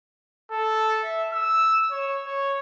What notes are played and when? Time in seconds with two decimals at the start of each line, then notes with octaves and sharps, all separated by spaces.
0.52 A4
1.04 E5
1.33 E6
1.91 C#5
2.26 C#5